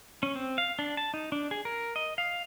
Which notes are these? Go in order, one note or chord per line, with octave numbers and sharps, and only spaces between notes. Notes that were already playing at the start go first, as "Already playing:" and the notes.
C#4
C4
F5
D4
A5
D#4
D4
G#4
A#4
D#5
F5